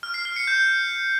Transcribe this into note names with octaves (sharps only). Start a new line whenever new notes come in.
F6
C7
F6
C#7
G6